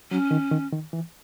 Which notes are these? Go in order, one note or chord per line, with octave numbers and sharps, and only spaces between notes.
F#3 C#4
D#3
D#3
D#3
E3